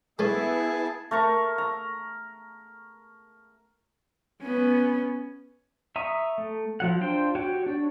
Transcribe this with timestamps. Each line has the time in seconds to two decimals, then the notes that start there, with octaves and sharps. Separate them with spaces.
0.19 G#3 A3 B3 C#4 E4 G#4 G#5 A5
1.11 A3 A#4 A#5 C#6
1.58 A#5
4.43 B3 C#4
5.96 E5 A#5 C#6 D#6
6.38 A3
6.80 F3 F#3 F#5
7.01 D4 F4 C5 G5 C6
7.35 F#4 G4 C#5 F#5 G5
7.66 D4 C#5